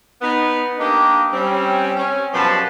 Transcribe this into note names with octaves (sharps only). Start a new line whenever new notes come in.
B3 D#4
A#3 D4 D#4 G4 D#5
G3 C4 C#4
C#4
F#2 B2 F3 G3 B4 A5